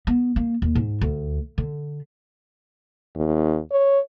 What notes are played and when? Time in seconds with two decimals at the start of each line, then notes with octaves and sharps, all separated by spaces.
0.07 B3
0.36 A#3
0.62 D#2
0.75 G#2
1.01 D2
1.58 D3
3.15 D#2
3.71 C#5